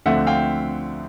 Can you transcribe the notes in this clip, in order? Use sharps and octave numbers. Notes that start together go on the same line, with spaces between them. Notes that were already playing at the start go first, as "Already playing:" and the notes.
D2 D3 F3 A3 C4 E5 F#5
F5 G5